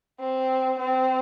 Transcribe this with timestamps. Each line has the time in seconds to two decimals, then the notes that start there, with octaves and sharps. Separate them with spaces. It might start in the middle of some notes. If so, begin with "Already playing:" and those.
0.20 C4
0.79 C4